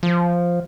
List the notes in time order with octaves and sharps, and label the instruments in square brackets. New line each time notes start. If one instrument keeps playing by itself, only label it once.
[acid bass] F3